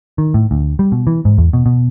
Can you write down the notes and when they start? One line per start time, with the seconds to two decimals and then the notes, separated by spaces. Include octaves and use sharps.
0.18 D#3
0.34 A2
0.51 D2
0.79 G3
0.92 B2
1.07 E3
1.25 G#2
1.38 E2
1.53 B2
1.66 B2